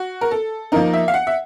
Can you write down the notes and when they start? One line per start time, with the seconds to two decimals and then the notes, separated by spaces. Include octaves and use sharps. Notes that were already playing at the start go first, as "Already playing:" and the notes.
Already playing: F#4
0.21 A#4
0.31 A4
0.72 F3 A#3 D#4 A#4
0.94 E5
1.08 F5
1.14 F#5
1.27 E5